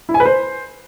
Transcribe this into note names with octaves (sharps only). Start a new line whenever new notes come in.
E4
G#5
B4
C5